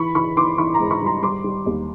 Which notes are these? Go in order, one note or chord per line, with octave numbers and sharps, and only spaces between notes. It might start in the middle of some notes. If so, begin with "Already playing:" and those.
Already playing: E3 B5 C#6
E3 B5 C#6
E3 C6 D6
E3 B5 C#6
A#5 C6
G#2
B5 C#6
G3 A#5 C6
G3 C6 D6
G3
D#2